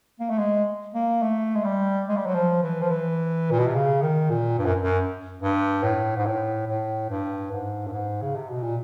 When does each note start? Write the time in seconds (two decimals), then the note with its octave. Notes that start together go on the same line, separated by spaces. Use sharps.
0.20 A#3
0.30 A3
0.38 G#3
0.94 A#3
1.22 A3
1.56 G#3
1.64 G3
2.08 G#3
2.17 G3
2.26 F#3
2.34 F3
2.63 E3
2.82 F3
2.90 E3
3.51 A#2
3.59 B2
3.67 C3
3.75 C#3
4.02 D#3
4.30 A#2
4.58 G2
4.65 F#2
4.81 F#2
5.42 G2
5.83 A2
6.17 G#2
6.26 A2
6.67 A2
7.10 G2
7.51 G#2
7.87 G2
7.93 G#2
8.22 C#3
8.36 C3
8.49 B2
8.63 A#2